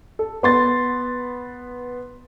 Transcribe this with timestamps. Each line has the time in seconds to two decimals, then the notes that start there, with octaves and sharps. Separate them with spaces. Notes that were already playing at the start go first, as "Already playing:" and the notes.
0.19 A4
0.43 B3 C6 A6